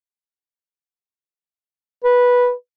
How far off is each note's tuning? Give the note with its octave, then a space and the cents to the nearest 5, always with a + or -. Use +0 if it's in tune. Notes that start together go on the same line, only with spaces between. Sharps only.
B4 -10